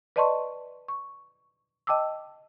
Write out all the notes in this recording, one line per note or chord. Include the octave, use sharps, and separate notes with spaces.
B4 D5 D#5 A5 C6 C#6
C#6
D#5 G5 A5 D6 E6